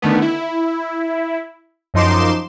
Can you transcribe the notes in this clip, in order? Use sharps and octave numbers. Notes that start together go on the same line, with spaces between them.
D3 D#3 A3 B3
E4
F#2 F3 D#4 C6 D6 E7